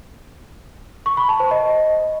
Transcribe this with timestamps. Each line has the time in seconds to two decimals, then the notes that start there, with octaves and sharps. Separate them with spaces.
1.06 C#6
1.17 B5
1.29 A5
1.40 C5
1.51 D#5